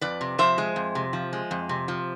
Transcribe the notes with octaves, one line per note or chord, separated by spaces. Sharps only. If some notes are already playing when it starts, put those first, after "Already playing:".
F2 B4 D5
C3
F3 C5 E5
G#3
F2
C3
F3
G#3
F2
C3
F3